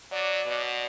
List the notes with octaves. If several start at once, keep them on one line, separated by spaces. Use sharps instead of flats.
F#3 D5
B2